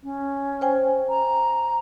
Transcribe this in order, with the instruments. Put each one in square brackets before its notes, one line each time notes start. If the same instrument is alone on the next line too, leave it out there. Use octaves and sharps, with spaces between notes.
[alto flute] C#4
[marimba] C5 G5 G#5
[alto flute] A#5